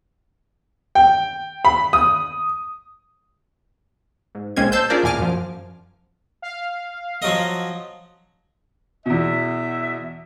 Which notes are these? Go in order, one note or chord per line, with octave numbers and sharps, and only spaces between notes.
G5
B5
D#6
G#2
B1 G#3 A#3 C4 C#4 G#6
C5 A5 E6 G6
C#4 D4 F4 G#4 A#4 D5
E2 A#2 G#5 D6 F6
F#2 F3
F5
F3 F#3 D#5
E2 B2 E5